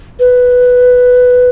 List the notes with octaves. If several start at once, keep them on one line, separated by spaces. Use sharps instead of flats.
B4